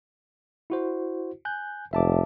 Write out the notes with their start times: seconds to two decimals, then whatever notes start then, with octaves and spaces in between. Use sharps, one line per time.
0.70 E4 F#4 C5
1.45 G#5 F#6 G6
1.93 F1 E5 A5 D6